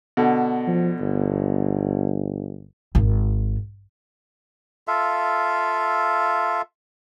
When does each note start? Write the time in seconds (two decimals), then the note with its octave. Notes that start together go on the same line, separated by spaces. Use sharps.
0.17 B2 D3
0.67 F3
1.01 G1
2.95 G#1
4.88 F4 A4 E5 F5